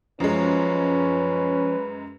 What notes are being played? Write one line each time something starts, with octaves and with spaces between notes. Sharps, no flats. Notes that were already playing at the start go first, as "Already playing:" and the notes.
F#2 F3 G#3 C#4 B4